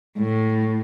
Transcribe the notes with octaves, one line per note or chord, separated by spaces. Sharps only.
A2